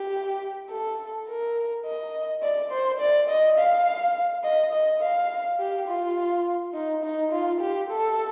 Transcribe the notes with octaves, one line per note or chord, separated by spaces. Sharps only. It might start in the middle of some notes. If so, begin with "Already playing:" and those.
Already playing: G4
A4
A#4
D#5
D5
C5
D5
D#5
F5
D#5
D#5
F5
G4
F4
D#4
D#4
F4
G4
A4